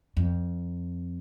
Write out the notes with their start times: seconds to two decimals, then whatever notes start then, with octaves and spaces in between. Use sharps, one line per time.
0.17 F2